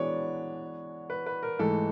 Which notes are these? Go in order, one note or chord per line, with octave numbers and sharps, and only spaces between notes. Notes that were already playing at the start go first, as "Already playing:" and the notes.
Already playing: E3 G#3 B3 D4 F#4 C#5 D5
B4
B4
A#4
G#2 E3 A3 A4